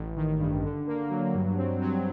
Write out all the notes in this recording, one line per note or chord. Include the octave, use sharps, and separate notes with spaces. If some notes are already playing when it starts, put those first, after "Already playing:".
Already playing: A1
D#3
G2
D3
A#3
F#3
G2
C4
F#3